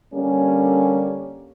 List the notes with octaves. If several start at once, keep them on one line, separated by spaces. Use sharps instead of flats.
D3 G3 A#3 C#4